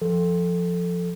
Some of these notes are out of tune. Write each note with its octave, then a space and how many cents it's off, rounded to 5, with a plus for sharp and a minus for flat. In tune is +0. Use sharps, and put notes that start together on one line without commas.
F3 +0 A4 +0